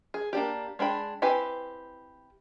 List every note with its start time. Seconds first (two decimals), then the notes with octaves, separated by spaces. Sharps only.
0.14 G#4
0.33 A#3 D4 G4
0.79 G#3 D4 G5 B5
1.22 C4 E4 G4 B4 G#5